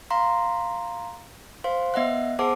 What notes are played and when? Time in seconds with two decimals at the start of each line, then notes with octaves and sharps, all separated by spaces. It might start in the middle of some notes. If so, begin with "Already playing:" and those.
0.11 F5 A#5 C6
1.64 C5 F5 C6
1.94 B3 D#5 E5 F#5 F#6
2.39 B3 G#4 C5 F#5 A5 D6